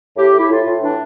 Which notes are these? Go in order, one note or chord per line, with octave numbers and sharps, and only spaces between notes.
A2 G4
A2
E4
A2 F4
A2
E3 D4